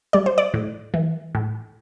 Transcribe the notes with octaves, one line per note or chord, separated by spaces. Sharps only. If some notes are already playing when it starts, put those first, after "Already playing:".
G3 D5
C5
D5
A2
E3
A2